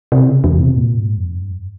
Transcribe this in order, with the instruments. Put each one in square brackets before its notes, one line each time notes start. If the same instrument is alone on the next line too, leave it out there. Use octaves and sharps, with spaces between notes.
[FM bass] C3
C#3
E2
C3
A#2
G#2
F2
G2